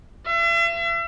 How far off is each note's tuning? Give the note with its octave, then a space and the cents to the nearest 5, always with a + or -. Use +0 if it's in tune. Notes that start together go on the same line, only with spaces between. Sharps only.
E5 +40